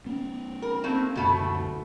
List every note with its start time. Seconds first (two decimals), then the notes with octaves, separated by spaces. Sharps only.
0.06 B3 C#4
0.62 A#4
0.84 A3 A#3 C4
1.15 F#1 D2 B2 A3